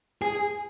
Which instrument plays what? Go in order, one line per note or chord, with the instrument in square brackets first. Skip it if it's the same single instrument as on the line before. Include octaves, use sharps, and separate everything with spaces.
[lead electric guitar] G#4